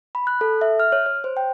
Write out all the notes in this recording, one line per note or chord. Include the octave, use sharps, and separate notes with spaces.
B5
F#6
A4
E5
F6
C#5
C#5
C5
G5